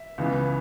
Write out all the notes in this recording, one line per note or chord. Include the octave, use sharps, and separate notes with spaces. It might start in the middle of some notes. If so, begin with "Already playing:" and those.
Already playing: E5
C#2 C#3 E3 B3